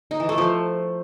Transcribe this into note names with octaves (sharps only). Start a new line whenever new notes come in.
D#4
E3
A3
F3